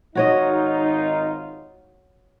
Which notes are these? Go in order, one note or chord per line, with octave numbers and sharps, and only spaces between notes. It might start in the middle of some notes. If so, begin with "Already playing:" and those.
G#1 D#4 F4 F#4 C#5 D#5